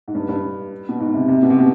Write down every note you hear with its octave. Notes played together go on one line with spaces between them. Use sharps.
G#2
G2
G2
B2
G#2
C3
C3
B2
C3
B2